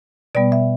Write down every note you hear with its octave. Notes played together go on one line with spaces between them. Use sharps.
B2 G3 B3 D5
E5